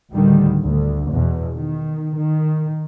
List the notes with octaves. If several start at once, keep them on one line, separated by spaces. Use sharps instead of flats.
D2 A2 D3 D#3 G3
D2
E2 B2
D#3
D#3